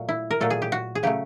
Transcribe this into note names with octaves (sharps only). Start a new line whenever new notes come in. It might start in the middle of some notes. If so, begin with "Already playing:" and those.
Already playing: A#2 F#3 A3
E4
A#4
A#2 F#3 A3 A4
G#4
G4
F#4
G#4
C#3 F#3 A3 G4